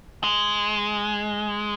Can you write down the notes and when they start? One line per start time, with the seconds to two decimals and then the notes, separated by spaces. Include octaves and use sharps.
0.24 G#3